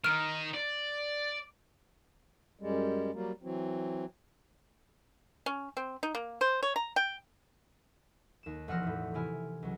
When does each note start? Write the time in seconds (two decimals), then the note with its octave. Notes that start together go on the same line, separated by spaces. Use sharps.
0.04 D#3 D#4 F6 D7
0.54 D5
2.61 F#2 G3 G#3
3.14 F#3 G3 A#3
3.42 E3 F#3 C4
5.46 C#4
5.77 C4
6.03 D#4
6.15 A#3
6.41 C5
6.63 C#5
6.76 A#5
6.96 G5
8.43 D#2 E7
8.68 E1 F3 F#5 E6 F6 A#6
8.83 E2 A2
9.14 C3 E3 E4 G#5 F6
9.63 C#2 F#3